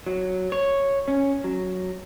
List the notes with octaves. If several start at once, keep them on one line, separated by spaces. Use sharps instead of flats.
F#3
C#5
C#4
F#3